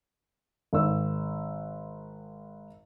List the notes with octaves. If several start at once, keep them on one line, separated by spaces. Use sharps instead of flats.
G#1 E6